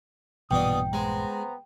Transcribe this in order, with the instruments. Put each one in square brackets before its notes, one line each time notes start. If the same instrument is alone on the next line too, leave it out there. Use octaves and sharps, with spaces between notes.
[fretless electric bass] A#1 G2 E3 [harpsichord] B2 D4 [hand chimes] G5 [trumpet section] D#6
[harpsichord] G#3 [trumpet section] B3 C5 A#5